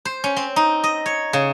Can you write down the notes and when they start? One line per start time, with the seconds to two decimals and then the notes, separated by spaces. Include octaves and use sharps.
0.05 C5
0.24 C#4
0.36 C4
0.56 D#4
0.84 D#5
1.06 C#5
1.33 C#3